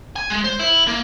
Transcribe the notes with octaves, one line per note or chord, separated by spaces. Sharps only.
G#5
G#3
C5
E4
A#3